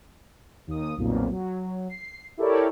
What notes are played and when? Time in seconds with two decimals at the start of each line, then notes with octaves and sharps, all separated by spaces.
0.67 D#2 D#6
0.97 B1 F2 A#2
1.31 F#3
1.89 C7
2.37 E4 G4 A4 A#4 C#5 D5